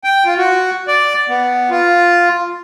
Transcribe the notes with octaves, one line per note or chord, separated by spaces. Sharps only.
G5
F4
F#4
D5
B3
F4